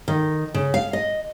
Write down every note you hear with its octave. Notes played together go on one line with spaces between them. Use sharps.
D#3
C#3
F5
D#5